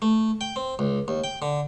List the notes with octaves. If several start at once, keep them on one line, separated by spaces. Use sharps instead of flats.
A3
G5
C4
C#2
D#2
G5
D3